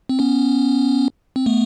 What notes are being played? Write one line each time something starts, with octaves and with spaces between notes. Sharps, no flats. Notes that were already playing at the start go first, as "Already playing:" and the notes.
C4
B3 C#4
C4
A3 B3